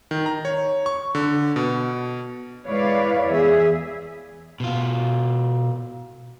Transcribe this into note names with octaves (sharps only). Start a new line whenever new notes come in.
D#3
A#5
C#5
C#6
D3
B2
G#3 E4 B4 C#5 D5 F5
E2 G#4 E5
B2 F4